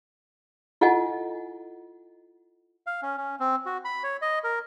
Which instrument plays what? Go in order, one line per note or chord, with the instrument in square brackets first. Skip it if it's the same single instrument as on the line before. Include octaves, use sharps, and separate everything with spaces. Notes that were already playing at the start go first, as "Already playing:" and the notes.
[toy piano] E4 F4 A4 D#5 F#5 G#5
[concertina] F5
C#4
C#4
C4
F#4
B5
C#5
D#5
A#4